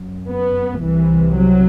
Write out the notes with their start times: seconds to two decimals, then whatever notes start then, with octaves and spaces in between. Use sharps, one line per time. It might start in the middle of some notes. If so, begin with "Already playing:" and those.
Already playing: F#2
0.28 B3
0.82 C2 C3 E3
1.37 F#3